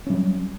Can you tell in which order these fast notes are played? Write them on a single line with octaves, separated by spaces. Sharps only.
C#4 G3 F#3